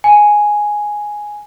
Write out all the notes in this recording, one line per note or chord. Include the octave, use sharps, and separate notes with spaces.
G#5